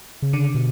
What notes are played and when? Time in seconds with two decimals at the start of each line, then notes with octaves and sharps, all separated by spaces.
0.22 C#3
0.33 D3
0.55 B2